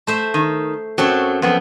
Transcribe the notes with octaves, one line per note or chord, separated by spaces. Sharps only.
A3 C5 E5
D#3
F#2 F#3 C4 A4 C#5
F2 B3 C4